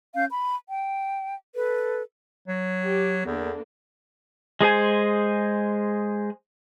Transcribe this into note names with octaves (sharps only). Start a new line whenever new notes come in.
C#4 F5 G6
B5
G5
A4 B4
F#3
G4
E2 D3 A#3 B3
G#3 G#4 C5 G#5